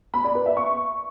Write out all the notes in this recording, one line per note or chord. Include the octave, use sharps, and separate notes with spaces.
B5
D5
B4
E5
C#6